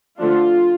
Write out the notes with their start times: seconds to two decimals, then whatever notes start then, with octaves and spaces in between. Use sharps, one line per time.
0.18 D3 F3 A3 D4 F4